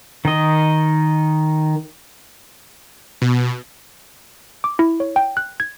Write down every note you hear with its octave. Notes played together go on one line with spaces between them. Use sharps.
D#3 D#5
B2
D6
E4
C#5
G5
F#6
G#6